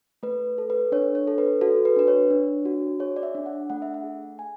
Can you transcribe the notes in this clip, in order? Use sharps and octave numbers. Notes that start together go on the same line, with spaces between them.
A3 B4
A4
B4
D4 C#5
C#5
A4
B4
F#4 A4
B4
D4 B4
C#5
D4
F#4
G#4 C#5
D5
E5
D4
F#5
A3 F#5
E5
F#5
G#4
G#4 G#5